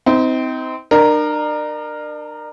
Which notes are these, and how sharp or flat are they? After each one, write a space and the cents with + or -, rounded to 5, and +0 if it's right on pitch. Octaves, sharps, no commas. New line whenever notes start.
C4 -20 D#4 +35
D4 +40 A#4 +0